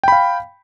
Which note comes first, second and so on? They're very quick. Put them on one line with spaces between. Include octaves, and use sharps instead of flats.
G5 B5 F5